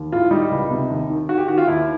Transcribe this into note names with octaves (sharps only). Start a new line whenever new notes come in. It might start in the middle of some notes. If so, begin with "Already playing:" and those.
Already playing: D#2
A2 F4
G3 D#4
C#2
C3
D#2
D#3
D#3 F#4
G4
D#3 F#4
F4
D#2 E4